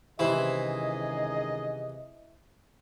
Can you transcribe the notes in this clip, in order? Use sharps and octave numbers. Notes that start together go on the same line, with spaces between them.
C#2 C3 D#3 E3 E4 G#4 C5 D#5